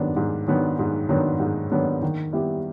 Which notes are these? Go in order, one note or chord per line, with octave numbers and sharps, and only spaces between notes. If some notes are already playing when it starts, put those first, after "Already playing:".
Already playing: G#2 D#3 F#3 B3 D4
G#2
D#3 F#3 B3 D4
G#2
D#3 F#3 B3 D4
G#2
D#3 F#3 B3 D4
D#3
G3 B3 E4 G4